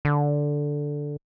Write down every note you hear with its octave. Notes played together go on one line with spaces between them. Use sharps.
D3